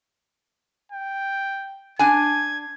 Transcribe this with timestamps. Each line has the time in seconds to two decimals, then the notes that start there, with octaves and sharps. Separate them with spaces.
0.92 G5
1.99 D4 G#5 G#6